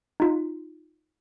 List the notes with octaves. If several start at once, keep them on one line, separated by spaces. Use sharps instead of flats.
D#4 F4